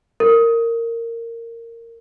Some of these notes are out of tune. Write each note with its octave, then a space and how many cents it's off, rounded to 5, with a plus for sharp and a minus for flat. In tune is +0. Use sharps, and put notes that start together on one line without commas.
A#4 -15